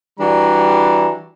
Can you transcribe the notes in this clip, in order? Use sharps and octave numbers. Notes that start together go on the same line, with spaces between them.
E3 G3 D4 F#4 A#5